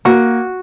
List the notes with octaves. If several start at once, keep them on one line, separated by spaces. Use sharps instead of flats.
A#3 F#4